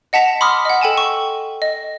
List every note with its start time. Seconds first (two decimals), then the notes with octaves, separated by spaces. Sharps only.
0.13 D#5 F#5 A5 B6 F7
0.41 B5 C6 D6 D#6 F6 B6
0.65 D#5 F#5
0.81 A4 G5 G#5 E7
0.97 C#6
1.62 D#5